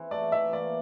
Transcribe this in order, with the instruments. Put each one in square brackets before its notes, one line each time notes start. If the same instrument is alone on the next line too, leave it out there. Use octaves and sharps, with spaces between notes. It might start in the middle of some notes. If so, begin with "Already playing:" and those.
Already playing: [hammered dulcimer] E3 C4
[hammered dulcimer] A3 [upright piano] D5
[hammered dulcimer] E3 [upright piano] E5
[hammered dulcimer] A#3 [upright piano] D5